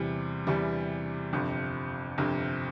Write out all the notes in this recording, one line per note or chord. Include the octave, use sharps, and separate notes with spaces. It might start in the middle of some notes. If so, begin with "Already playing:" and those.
Already playing: E2 C3 E3 G3
E2 C3 E3 G3
G1 F2 C3
G1 F2 C3